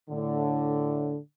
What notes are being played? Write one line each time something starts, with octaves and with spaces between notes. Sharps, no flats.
A2 D3